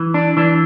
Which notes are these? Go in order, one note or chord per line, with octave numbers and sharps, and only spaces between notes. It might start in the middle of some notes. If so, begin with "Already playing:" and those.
Already playing: E3
D4
E3 D4